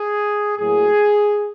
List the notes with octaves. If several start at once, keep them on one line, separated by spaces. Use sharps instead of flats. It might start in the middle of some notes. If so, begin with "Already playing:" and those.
Already playing: G#4
A2 F#3 A#3 G#4